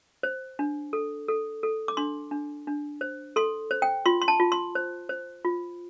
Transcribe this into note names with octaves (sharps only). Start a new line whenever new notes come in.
C5
D4
A4
A4
A4
D6
D4 C6
D4
D4
C5
A4 C6
C5
G5
F4 C6
C6
A5
F4
C6
C5
C5
F4